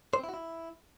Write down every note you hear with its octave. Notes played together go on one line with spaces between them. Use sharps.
C5
C4
E4
F#4
E4